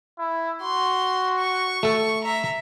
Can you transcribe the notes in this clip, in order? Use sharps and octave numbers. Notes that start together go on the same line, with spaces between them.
E4
F#4 C6
C#6
A3 A4
E5 A#5